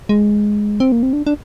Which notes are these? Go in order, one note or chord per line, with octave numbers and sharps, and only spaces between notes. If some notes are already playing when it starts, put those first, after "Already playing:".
G#3
C4
A#3
C4
D4
D4